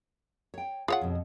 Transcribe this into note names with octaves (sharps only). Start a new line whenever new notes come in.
C#5 G5
F4 G#4 C#5 F#5
F2 B2